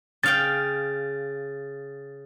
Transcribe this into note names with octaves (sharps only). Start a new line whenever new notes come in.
C#3 F5 G5 A6